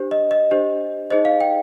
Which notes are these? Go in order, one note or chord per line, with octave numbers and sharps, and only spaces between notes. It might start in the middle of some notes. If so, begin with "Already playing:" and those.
Already playing: D4 G4 C5
D#5
D#5
D4 G4 C5
D#4 G#4 C5 D#5
F5
G5